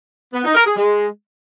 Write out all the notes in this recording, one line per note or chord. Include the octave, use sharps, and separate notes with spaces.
B3
D#4
A#4
G#4
G#3